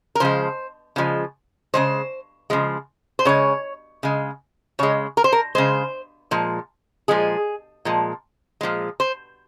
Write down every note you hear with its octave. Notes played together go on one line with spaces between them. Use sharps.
A#4
C#3 F3 G#3 C5
C#3 F3 G#3
C#3 F3 G#3 C5
C#3 F3 G#3
C5
C#3 G#3 C#5
C#3 G#3
C#3 G#3 C#5
A#4
C5
A#4
C#3 G#3 C5
A#2 F3 G#3
A#2 F3 G#3 G#4
A#2 F3 G#3
A#2 F3 G#3
C5